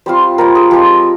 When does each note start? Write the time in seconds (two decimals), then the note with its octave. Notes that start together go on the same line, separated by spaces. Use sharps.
0.06 G3 C4 F4 C5
0.38 G3 C4 F4 A#4
0.55 G#4
0.71 F3 G#3 C4 F4 G4